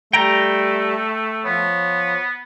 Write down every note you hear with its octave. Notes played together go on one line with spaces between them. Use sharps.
G3 A3 G5 A#5
F3 B3 F4 C#5